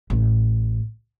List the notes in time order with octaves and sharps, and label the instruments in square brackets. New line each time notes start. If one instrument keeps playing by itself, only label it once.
[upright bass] A1 A2